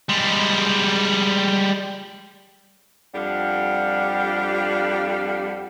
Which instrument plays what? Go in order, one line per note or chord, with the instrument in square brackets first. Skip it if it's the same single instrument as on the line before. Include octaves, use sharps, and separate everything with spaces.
[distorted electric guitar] G3 G#3
[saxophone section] F2 G3 D4 G4 F5 F#5